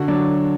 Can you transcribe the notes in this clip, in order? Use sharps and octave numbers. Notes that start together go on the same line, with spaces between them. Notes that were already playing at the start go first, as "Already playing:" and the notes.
Already playing: D3 F#4
F#3 D4